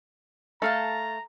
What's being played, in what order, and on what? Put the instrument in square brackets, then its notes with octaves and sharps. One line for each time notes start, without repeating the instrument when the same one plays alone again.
[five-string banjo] A3 [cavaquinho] A4 F5 A5 [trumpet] A#5